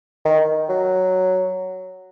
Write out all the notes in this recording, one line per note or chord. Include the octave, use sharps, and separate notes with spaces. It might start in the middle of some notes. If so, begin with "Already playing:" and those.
D#3
F#3